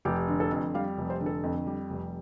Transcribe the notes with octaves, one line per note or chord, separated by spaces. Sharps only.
F1 G4
D3
A4
F2
G3 F5
F1
C5
D3
A4
F2
G3
F1